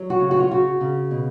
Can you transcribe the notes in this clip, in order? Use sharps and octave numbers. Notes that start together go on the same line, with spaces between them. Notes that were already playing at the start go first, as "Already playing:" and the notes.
Already playing: F#3
F#4
C#3
F#4
F4
C#3 F#4
C#3
B2